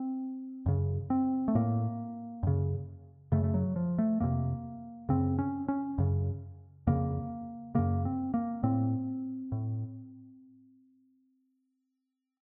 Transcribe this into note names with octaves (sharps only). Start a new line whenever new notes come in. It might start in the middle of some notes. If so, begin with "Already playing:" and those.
Already playing: C4
F#2 C#3
C4
A3
A2 A#3
F#2 C#3
F#2 C#3 A3
A3
F#3
F3
A3
F2 C3 A#3
F#2 C#3 C4
C#4
C#4
F#2 C#3
F2 C#3 A#3
F#2 C#3 A#3
C4
A#3
A2 C4
A2